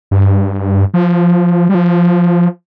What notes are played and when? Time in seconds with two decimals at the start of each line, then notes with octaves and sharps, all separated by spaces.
0.11 G2
0.94 F3
1.69 G3
1.75 F3